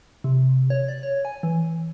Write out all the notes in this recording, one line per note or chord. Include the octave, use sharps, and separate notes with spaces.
C3
C#5
D5
C#5
G#5
E3